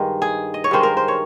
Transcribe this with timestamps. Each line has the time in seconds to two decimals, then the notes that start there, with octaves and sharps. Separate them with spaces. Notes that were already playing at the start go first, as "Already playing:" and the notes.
Already playing: G2 D#3 G#3
0.22 G#4
0.54 D#5
0.64 C#5
0.71 G2 D#3 G#3 C5
0.83 A#4
0.97 C5
1.08 C#5